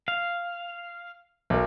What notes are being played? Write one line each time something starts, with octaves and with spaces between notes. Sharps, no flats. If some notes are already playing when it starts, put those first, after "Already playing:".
F5
B1 A#4